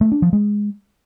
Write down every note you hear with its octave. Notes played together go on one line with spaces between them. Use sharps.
A3
D4
F3
G#3